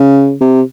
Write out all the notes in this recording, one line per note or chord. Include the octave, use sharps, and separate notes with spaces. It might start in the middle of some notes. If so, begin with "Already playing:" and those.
Already playing: C#3
C3